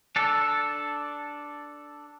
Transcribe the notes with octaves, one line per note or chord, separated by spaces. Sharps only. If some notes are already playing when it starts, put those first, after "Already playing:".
D4 A4